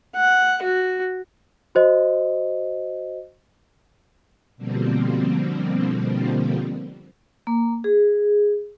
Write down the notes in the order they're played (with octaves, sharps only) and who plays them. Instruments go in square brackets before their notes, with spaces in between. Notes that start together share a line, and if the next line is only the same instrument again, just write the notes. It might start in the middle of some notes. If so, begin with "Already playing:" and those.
[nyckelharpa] F#5
F#4
[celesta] F#4 C5 D#5
[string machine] B2 D3 F3 G3 A#3 C4
[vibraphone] A#3
G#4